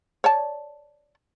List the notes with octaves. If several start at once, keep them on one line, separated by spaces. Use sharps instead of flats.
C#5 D5 A5